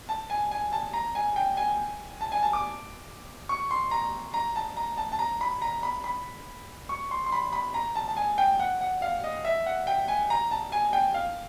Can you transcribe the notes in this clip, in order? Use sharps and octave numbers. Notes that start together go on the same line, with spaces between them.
A5
G#5
G#5
A5
A#5
G#5
G5
G#5
A5
G#5
A5
D6
C#6
C6
A#5
A#5
A5
A#5
A5
A5
A#5
B5
A#5
B5
B5
C#6
C6
C6
B5
B5
A#5
A5
A5
G#5
G5
F#5
F#5
F5
D#5
E5
F#5
G5
G#5
A#5
A5
G#5
G5
F5